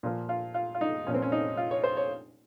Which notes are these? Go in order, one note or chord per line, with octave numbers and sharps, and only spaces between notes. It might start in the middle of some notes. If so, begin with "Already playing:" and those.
A#2 F3
F4
F4
F4
D#4
A#2 F3 C#4
C4
C#4
D#4
F4
C#5
C5
C#5